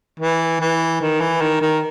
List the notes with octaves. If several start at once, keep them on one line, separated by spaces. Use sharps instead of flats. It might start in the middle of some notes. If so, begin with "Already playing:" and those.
E3
E3
D#3
E3
D#3
D#3